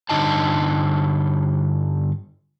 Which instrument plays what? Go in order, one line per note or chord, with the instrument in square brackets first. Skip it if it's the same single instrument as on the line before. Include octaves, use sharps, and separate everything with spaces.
[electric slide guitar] G2 D3 D#4 D#5 A5